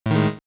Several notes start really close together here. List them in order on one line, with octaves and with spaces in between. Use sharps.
A2 D#3 G#3